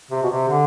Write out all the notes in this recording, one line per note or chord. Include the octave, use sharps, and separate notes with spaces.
C3
B2
C3
D3